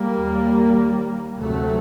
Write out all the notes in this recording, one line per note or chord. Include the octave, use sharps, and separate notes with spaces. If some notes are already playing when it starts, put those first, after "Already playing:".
Already playing: G3 A#3
D#2
D2 C3 F#3 A3